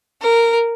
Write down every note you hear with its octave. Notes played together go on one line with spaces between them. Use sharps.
A#4